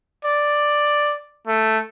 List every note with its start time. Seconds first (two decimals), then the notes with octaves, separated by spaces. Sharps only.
0.25 D5
1.47 A3